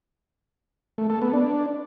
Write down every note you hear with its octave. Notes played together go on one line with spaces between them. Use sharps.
A3
A4
B3
D4